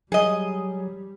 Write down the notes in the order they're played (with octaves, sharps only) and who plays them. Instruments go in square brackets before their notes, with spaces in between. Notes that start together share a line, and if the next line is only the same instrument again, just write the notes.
[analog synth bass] F#3 [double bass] G3 [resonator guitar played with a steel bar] G#4 D#5